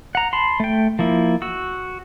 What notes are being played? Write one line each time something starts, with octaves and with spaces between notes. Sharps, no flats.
F#5 A#5
A5 B5 C6
A3 G5
F3 A#3 E4
F#4 E6